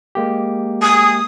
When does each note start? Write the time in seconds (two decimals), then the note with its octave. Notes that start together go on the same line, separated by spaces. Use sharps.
0.15 G#3 A#3 G4
0.82 G#4 D#6